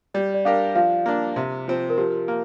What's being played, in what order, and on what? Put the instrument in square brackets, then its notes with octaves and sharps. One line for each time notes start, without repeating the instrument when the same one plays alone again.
[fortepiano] G3 [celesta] D5
[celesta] D5
[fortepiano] D4 G4 A#4 [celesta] F5
[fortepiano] F3 [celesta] F5
[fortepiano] A#3 D4
C3
F3 C4
[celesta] A#4
[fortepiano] F3 [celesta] G4
[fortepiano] A#3